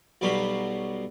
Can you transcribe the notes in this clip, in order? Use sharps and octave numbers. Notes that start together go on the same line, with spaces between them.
B1 B2 F#3 G3 F5 B5